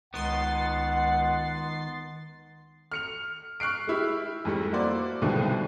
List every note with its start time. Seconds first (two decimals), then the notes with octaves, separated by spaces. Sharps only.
0.14 C#2 D#3 B3 F#5 C6 A6 C7
2.92 F6 C#7 F7
3.60 C#6 F6 F#6 C7 D7
3.87 G#3 E4 G4
4.45 F2 G#2 G3 A3
4.72 A#3 E4 F#4 C5 D5
5.22 C2 G#2 B2 D3 D#3 F3